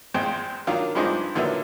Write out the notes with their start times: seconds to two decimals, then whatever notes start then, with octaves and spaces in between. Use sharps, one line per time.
0.14 A#1 E2 G#3 C4 C5 G5
0.67 D#3 F#3 A#3 D4 F4
0.95 G2 F3 G#3 C4 D4 D#4
1.35 A#2 D3 D#3 F#3 B3 E4